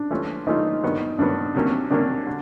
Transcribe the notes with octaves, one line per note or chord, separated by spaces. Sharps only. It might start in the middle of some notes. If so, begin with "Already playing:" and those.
Already playing: D4
E3 A3 C#4 F4
E3 A3 C#4 D#4 F4
G2 D#3 F#3 B3
G2 D#3 F#3 B3 D4
C3 D#3 F#3 A#3 C#4
C3 D#3 F#3 A#3 C#4 D4
D3